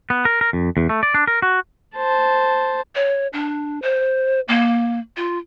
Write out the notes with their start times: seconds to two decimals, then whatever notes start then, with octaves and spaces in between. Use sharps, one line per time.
0.10 B3
0.25 A#4
0.41 A#4
0.53 F2
0.77 E2
0.89 A3
1.03 D5
1.14 D4
1.27 A#4
1.42 F#4
1.95 C5 A5
2.95 C#5
3.33 D4
3.82 C5
4.48 A#3
5.17 F4